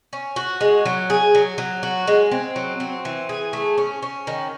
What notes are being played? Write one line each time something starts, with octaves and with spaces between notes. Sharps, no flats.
C#4
F#4
G#3
F#3
G#4
F#3
F#3
F#4
G#3
C4
F#3
C4
E3
G#4
A3
C#4
C#4
D#3